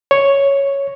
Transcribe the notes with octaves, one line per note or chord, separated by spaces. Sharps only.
C#5